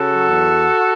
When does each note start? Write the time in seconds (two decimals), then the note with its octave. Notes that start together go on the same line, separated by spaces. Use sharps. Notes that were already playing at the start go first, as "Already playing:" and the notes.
Already playing: C#3 F#4 A4
0.11 F#3
0.29 E2